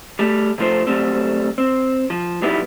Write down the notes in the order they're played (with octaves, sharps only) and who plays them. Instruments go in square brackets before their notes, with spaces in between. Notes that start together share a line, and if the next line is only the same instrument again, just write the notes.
[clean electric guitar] G3 A3
C3 F3 A3 F4 A4 C5
D2 G2 F#3 G3 A3 C4
C4
F3
F2 F#3 G3 B3 D#4 E4